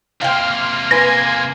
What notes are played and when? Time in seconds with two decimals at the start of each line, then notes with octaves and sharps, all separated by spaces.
0.22 C3 A#3 F5 G5 C6 F6
0.91 B4 G#5 C6 G#6 A#6